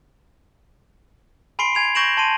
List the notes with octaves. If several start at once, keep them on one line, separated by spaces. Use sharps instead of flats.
G#5 B5 C6 C7 D7 G7
G#5 G#6 F7
C#6 G6 A#6 D7 E7 F#7
A5 C6 D#7